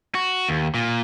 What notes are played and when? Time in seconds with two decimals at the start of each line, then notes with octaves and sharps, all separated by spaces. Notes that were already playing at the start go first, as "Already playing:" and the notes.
0.15 F#4
0.49 D#2
0.74 A#2